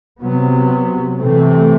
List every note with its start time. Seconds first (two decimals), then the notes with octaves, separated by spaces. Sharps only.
0.22 C3 F#3 B3
1.20 C3 E3 A3 C4